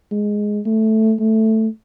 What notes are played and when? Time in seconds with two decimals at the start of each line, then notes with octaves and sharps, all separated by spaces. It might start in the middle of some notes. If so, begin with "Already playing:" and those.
0.11 G#3
0.65 A3
1.19 A3